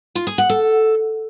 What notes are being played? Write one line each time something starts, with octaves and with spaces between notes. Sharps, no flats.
F4
G#4
F#5
A4